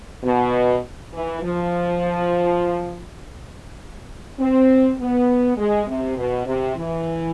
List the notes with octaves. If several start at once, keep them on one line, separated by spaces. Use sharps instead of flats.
B2
E3
F3
C4
B3
G#3
C3
B2
C3
E3